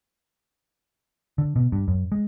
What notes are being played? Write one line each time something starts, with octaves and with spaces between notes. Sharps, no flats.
D3
B2
G2
F#2
G#3